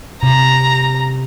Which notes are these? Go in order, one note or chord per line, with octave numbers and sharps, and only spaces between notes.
C3 A#5